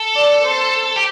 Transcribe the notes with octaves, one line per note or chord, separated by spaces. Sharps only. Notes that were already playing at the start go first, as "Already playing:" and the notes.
Already playing: A4
D5
C5
G4